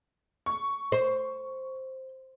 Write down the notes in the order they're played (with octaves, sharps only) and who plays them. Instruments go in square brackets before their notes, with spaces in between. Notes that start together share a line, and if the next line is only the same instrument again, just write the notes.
[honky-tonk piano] C#6
[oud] C5